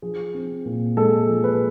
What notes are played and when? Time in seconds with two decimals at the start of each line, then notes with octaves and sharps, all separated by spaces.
0.02 F3 G#4
0.34 C4
0.65 A#2
0.97 G#3 A4
1.28 F3
1.44 B4